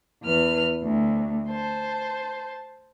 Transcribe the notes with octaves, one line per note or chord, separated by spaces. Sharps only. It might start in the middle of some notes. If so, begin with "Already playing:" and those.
E2 B4 F6
D2
C5 A5